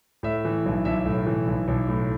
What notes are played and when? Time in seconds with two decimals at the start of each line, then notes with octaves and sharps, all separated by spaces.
0.23 A2 E5
0.45 E3
0.65 B1
0.85 B1 E5
1.06 A2
1.26 E3
1.47 B1
1.68 B1
1.88 A2